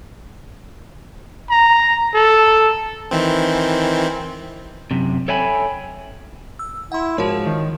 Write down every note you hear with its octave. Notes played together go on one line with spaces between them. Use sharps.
A#5
A4
D#3 E3 C4
F#2 C3
A4 C#5 E5 G5 G#5 B5
E6
E4 F#5 C6
G#2 F3 F#4 A#4 C#5
D#3